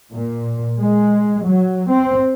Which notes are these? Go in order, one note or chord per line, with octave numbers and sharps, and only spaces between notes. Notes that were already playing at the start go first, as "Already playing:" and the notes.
A#2
G#3
F#3
C4